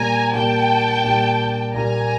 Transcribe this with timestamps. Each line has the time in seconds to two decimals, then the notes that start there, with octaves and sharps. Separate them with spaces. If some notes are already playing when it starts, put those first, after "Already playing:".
Already playing: A#2 G3 A#3 G#5 A#5
0.33 A#2 G3 A#3 G5 A5
1.04 A#2 G3 A#3
1.74 A#2 G3 A#3 G#5 A#5